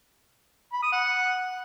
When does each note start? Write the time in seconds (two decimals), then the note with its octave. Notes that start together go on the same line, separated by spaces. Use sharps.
0.73 B5
0.83 D#6
0.92 F#5